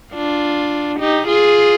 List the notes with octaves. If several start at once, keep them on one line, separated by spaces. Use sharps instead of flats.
D4 F4
D#4 G4
F4 G#4